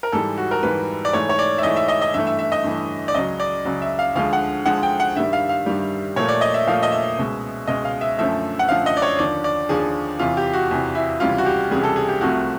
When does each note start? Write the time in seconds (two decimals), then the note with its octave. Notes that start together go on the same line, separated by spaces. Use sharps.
0.03 A#4
0.12 G#2 E3 G3 A4
0.38 F#4
0.51 A#4
0.63 G#2 E3 G3 B4
1.05 D5
1.13 G#2 E3 A3 C#5
1.29 C#5
1.39 D5
1.58 E5
1.63 G#2 E3 A3 D#5
1.76 E5
1.88 D#5
2.01 D#5
2.14 G2 E3 A3 E5
2.27 E5
2.39 E5
2.52 D#5
2.64 G2 E3 A3
3.08 D5
3.15 C#2 C#3 F#3 D#5
3.40 D5
3.65 C#2 C#3 F#3
3.81 E5
3.99 F5
4.15 D2 D3 F3 G#3 F5
4.33 F#5
4.66 D2 D3 F3 G#3 F#5
4.83 G5
5.00 F#5
5.16 G2 D#3 G3 E5
5.33 F5
5.49 F5
5.66 G2 D#3 G3
6.16 A#2 F3 A3 C#5
6.28 D5
6.41 D#5
6.54 E5
6.67 A#2 F3 A3 F5
6.83 D#5
6.92 E5
7.17 C#2 B2 G#3
7.67 C#2 B2 G#3 D#5
7.85 F5
8.01 E5
8.18 F#2 D3 F3 A3 E5
8.59 F#5
8.69 F#2 D3 F3 A3 F5
8.86 D#5
8.97 D5
9.02 C#5
9.19 D#2 D3 F3 D5
9.44 D5
9.69 D#2 D3 F3 G#4
10.19 E2 C3 E3 F4
10.37 G4
10.53 F#4
10.71 E2 C3 E3
10.95 E4
11.20 C#2 C3 E3 G3 F4
11.38 F#4
11.46 G4
11.71 C#2 C3 E3 G3 G#4
11.83 A4
11.96 G#4
12.09 G4
12.21 C2 C3 F3 A3 F#4